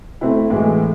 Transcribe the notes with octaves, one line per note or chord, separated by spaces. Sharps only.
A3 C4 E4
A2 E3 G#3